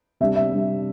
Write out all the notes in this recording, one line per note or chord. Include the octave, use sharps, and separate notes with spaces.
C3 G3 D4 E5
E5
C3 G3 D4